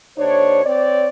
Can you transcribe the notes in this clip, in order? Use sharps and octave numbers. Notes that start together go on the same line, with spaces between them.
D#2 D4 C5 C#5
C4 C#5 D5